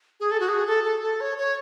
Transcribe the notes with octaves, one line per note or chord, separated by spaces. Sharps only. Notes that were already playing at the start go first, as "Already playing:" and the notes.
G#4
A4
F#4
G#4
A4
A4
A4
C#5
C#5